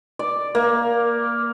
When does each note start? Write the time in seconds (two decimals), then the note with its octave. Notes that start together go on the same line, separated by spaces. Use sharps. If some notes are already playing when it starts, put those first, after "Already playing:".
0.19 D5
0.55 A#3